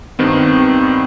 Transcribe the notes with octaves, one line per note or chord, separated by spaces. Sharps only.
G2 D#3 B3 C4